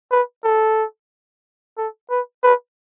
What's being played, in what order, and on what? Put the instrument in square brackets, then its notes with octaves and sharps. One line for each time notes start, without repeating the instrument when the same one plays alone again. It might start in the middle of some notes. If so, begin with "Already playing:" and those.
[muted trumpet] B4
A4
A4
B4
B4